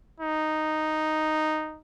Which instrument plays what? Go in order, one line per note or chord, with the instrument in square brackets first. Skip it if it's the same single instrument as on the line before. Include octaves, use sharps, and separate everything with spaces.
[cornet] D#4